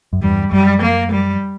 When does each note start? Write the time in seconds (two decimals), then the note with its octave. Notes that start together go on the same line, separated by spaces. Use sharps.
0.13 F#2
0.22 E2 G2 G3
0.52 F#2 G3
0.82 A#3
1.12 G3